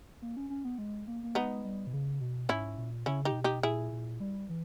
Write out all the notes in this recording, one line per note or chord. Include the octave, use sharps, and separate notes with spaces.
A#3
C#4
C#4
B3
G#3
A#3
A#3
G#3 B3 D#4
G3
B2
C#3
B2
G#2 C#4 E4
A#2
C#3 C#4 E4
D#4 G4
A#2
B2
D#4 G4
A#2 E4 G#4
A#2
G3
E3